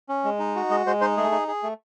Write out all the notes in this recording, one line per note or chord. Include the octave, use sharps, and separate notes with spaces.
C#4
G#3
D#4
F#4
G#3 D#5
G#3 C5
D#4 C5
A3 G#4
D#4
G#4
A3